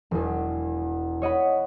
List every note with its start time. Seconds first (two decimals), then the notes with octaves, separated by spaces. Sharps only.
0.11 E1 E2
1.22 C#5 D#5 F#5 B5